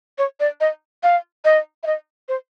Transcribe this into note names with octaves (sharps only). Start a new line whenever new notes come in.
C#5
D5
D#5
F5
D#5
E5
D#5
C5